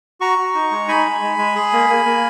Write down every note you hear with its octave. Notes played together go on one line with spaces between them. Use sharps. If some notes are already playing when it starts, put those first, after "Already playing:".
F#4 A#5 C#6
F#4
D#4
G#3
D#4 G#5 B5
G#3
G#3
G#3
G#4
A#3
A#3
A#3